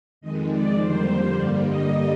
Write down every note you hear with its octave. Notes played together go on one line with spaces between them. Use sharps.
F2 D#3 G#3 D#5
D5
F2 D3 G3 A#3 C5
G2 D3 G3 A#3 D5
D#5